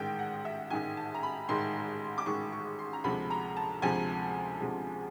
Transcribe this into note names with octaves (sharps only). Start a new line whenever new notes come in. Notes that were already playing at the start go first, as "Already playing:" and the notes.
Already playing: A1 G#2 D#3 G#3 G5
F#5
E5
A1 G#2 D#3 G#3 G#5
A5
A#5
B5
A1 G#2 D#3 G#3 C6
D6
A1 G#2 D#3 G#3 C#6
C#6
C6
A#5
D2 C3 F3 G#3 B5
A#5
A5
D2 C3 F3 G#3 G#5
D2 C3 F3 G#3